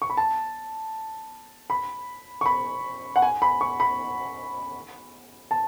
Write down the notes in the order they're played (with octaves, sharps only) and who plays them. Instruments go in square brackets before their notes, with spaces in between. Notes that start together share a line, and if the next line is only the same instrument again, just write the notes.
[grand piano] C#6
B5
A5
B5
C#6
B5
F#5
G#5
B5
C#6
B5
A5